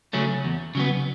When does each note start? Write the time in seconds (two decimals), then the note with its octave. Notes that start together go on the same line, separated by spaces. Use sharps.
0.13 C#3 F#3 A3 C#4
0.45 E2
0.75 C#3 F#3 B3